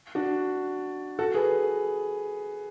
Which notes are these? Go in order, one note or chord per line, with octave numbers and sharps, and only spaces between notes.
D4 F#4
F#4 A4
G#4 B4